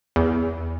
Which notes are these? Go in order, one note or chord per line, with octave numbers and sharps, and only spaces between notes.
E2